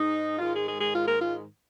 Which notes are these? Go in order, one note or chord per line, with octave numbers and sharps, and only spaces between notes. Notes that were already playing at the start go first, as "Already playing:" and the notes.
Already playing: G#2 G#3 D#4
G#2 D#3 G#3 F4
G#4
G#4
G#4
F4
A#4
F4